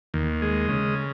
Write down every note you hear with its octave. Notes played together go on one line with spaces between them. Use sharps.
D#2
G#3
C#3